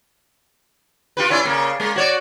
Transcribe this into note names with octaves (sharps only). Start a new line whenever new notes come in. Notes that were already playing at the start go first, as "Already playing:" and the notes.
F4 G4 B4
C#4 E4 D5
C#3 A#3
G#3 A#3
F#4 C#5 D5